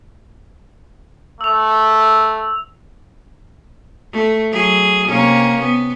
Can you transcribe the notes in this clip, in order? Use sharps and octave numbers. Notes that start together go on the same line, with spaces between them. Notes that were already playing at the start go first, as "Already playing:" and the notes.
A3 E6 F7
A3
F#3 G#4
C3 A#3 C#4
B3